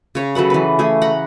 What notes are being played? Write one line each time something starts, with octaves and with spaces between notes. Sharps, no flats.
C#3 C#5
F#3 A4 B4 F#5
E3 B4
A3 G#4
F#5 A#5 B5